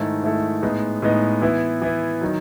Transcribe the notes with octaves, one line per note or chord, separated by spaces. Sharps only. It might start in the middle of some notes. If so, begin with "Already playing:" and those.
Already playing: G#2 D#3 A3 E4 A4
G#2 D#3 A3 E4 A4
A2 G#3 B3 D#4
A2 G#3 B3 D#4
E3 B3 E4
E3 B3 E4
D#3 F#3